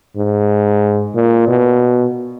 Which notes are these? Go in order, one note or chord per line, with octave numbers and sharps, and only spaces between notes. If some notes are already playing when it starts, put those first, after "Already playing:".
G#2
A#2
B2